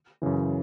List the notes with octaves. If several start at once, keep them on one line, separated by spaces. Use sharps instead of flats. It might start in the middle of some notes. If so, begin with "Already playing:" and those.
F#2 C#3 E3